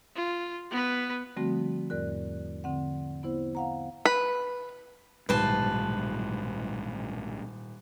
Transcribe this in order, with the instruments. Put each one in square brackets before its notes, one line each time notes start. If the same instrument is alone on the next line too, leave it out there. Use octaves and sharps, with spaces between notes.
[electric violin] F4
B3 B4
[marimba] D3 F3 G3 A3 C4 F#4
E2 G#2 A#4 D5 F#6
D3 C4 F#5
B3 E4 C5
F5 F#5 A#5
[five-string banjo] B4
[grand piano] D#1 [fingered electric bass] B1 G#2 [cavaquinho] B4 C5 A5